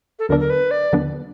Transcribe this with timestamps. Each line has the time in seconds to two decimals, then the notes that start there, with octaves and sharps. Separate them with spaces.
0.19 A4
0.29 D#2 D3 F#3 B3 D4 A#4
0.40 A#4
0.50 B4
0.71 D5
0.92 D#2 D3 F#3 B3 D4